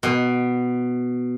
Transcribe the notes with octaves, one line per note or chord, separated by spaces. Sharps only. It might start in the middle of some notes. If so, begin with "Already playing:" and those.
B2